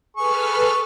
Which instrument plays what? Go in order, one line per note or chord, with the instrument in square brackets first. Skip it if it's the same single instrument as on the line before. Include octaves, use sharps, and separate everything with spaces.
[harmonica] G#4 C#6 [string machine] A4 B4 F6